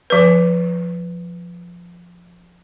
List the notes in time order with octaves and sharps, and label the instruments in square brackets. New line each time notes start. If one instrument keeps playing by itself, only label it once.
[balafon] F3 B4